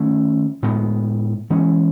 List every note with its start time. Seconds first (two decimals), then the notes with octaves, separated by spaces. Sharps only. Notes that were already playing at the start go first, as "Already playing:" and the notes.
Already playing: D#3 A3 C#4
0.63 A2 G#3 B3
1.50 E3 G#3 C#4